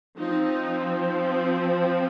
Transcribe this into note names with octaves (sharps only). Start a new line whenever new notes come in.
F3 C4 D#4